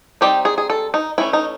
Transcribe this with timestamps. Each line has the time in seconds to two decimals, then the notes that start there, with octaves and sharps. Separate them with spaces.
0.21 G3 C4 D#4 G4
0.45 G#4
0.58 G#4
0.70 A4
0.94 D#4
1.18 E3 A3 C#4 E4
1.33 D#4